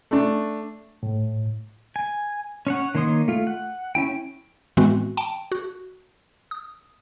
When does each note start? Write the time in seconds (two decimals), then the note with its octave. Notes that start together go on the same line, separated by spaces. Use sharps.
0.11 A3 D4
1.03 A2
1.96 G#5
2.67 C#4 C#5 F#5
2.95 D#3 A#3 C#5 C6 D#6
3.28 A3 F4
3.47 F#5
3.95 C#4 E4 G5
4.77 A2 E3 G#3 B3 C4 F#4
5.17 G5 A5 D7
5.52 F#4
6.51 D#6